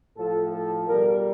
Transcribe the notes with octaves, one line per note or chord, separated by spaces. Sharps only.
A2 F3 A4
A4
B2 G3 A#4